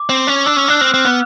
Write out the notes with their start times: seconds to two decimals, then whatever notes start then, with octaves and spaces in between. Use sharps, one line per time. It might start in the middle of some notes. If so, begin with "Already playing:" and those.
Already playing: D6
0.09 C4
0.27 C#4
0.45 D4 E6
0.57 C#4 F6
0.68 D4 F#6
0.81 C4 F6
0.94 C4
0.99 F6
1.05 B3